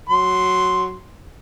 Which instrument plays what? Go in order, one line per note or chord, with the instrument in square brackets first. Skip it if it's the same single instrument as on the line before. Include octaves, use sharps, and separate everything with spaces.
[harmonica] F#3 C6